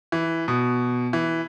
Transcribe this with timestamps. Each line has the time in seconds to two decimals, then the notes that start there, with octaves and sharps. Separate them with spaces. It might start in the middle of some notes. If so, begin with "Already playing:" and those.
0.12 E3
0.48 B2
1.13 E3